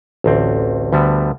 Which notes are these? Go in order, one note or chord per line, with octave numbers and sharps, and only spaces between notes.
A1 D2 C4
D2 D3 G3 B3